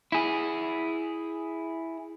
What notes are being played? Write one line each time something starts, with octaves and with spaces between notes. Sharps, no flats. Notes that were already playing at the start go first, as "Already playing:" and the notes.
E4 G#4